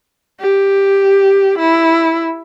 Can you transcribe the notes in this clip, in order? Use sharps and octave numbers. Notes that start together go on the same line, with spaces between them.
G4
E4